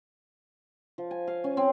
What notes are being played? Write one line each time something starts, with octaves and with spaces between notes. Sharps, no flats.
F3
G#5
F5
C#4
C4